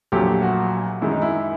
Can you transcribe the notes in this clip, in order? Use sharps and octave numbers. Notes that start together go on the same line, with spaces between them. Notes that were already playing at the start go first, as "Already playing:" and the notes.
A#1 A#2 F#3 A3 G4
F#4
F#2 D#3 G#3 E4
D#4
E4